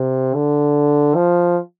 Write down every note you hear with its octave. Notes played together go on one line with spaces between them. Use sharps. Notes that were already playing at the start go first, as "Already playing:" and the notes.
Already playing: C3
D3
F3